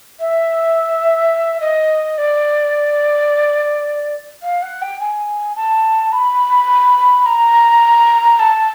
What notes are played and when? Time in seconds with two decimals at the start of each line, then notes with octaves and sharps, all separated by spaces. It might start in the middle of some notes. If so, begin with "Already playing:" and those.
0.20 E5
1.61 D#5
2.18 D5
4.43 F5
4.62 F#5
4.82 G5
5.00 G#5
5.56 A5
6.12 B5
7.26 A#5
8.40 A5